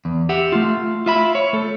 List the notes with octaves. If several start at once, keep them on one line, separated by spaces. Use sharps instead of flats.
E2
G4 E5 F#5
A3 F4
F4 E5 B5
C#5
A3 A4